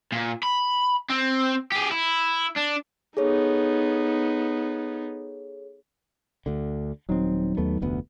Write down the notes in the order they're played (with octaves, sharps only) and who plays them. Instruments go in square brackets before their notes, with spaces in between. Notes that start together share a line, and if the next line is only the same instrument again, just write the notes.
[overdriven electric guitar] A#2
B5
C4
G4 G#4
E4
D4
[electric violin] B3 D#4 [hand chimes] G#4 A4 C#5
[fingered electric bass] D2 D3
[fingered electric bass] D#1 C4 [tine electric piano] F#3 D#4
[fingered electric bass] D#2 A3 B3
F1 D2 B3